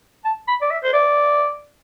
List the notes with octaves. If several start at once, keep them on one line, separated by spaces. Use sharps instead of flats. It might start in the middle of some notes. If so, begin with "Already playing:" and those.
A5
B5
D5
E5
C5
D5